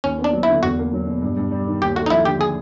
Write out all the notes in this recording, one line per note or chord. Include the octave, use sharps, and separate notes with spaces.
D#2 C#4
B3
D4
F#3
E4
D3
E2 F#4
A#3
F#3
B2
G2
G2
G3
D#3
D#2 G4
A3 F#4
D#4
F3 E4
D3 G4
G#4